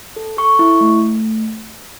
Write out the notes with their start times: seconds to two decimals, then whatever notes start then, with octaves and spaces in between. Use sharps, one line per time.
0.16 A4
0.37 A4 C#6
0.59 E4
0.81 A3
1.02 A3